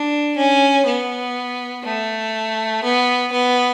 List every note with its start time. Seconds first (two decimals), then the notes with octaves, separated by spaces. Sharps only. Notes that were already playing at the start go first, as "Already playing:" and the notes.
Already playing: D4
0.37 C#4
0.86 B3
1.84 A3
2.84 B3
3.32 B3